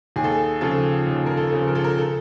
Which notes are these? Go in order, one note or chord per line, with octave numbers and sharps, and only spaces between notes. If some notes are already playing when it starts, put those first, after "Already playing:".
D#2 G#4
A4
G#4
C#3 F3 A4
D#2
A#4
A4
C#3 F3
A#4
A4
A#4
A4